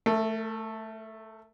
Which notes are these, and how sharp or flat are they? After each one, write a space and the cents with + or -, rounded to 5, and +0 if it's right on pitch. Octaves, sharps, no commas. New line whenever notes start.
A3 +0 A#4 -40